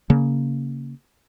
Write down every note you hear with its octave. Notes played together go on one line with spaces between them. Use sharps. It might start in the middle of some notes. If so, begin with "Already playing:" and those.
C#3 A#3